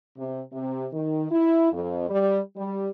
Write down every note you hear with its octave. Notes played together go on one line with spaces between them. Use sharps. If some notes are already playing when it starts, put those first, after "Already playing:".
C3
C3
D#3
E4
F2
G3
G3